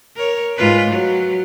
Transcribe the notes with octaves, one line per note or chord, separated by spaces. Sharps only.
A#4 C#5
G#2 F4 B4
F#3